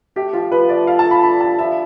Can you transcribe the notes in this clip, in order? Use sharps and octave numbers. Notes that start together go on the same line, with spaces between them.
A3 G4
F3 F4
F3 B4
A3 D5
A4 F5
A5
A4
B5
D4 B5
G3 A5
F3 E5